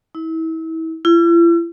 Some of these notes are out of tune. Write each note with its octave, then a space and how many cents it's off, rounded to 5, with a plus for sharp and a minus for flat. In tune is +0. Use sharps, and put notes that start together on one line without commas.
E4 -35
E4 +45